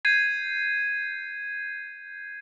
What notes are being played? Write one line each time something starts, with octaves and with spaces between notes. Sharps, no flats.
G6 G#6 C7 D#7